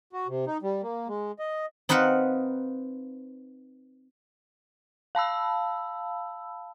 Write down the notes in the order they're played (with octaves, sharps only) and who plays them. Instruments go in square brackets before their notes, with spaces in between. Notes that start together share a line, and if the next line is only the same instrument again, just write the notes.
[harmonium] F#4
C3
D#4
G3
A#3
G#3
D#5
[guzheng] C4 D#4 B4 F5 F#5
[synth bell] F5 A5 B5 E6